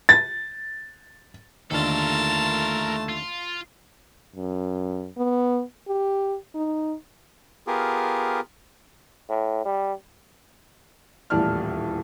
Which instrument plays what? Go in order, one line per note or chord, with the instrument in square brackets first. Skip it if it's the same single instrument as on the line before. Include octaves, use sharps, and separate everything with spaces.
[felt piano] A6
[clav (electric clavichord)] D#2 D3 [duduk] A3 [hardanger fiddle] F4 A5 [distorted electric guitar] A4 A#4
[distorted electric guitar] F4
[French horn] F#2
B3
G4
D#4
[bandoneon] B3 F4 G4 G#4 A#4
[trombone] A2
G3
[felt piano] D#1 E2 A2 D5 A5 F6